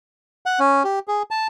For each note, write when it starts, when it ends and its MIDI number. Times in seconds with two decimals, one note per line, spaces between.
0.46 0.59 78
0.60 0.83 61
0.84 0.99 67
1.08 1.23 68
1.31 1.47 81